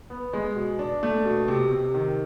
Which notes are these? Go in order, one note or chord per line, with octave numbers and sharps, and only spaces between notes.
B3
G#3
B2
D4
A3
B2
C3
C3
D#3